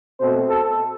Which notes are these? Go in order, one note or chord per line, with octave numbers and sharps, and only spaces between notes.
B2 A3 C4 C5
A4